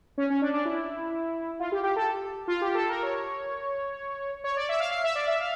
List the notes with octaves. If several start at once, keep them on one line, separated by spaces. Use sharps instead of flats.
C#4
C#4
D4
D4
E4
F4
G4
G4
A4
F4
G4
A4
A#4
C#5
C#5
D5
E5
F5
F5
E5
D5
E5
F5